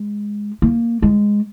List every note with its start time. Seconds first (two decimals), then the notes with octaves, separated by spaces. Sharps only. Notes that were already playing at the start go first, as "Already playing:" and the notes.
Already playing: G#3
0.62 A#3
1.02 G#3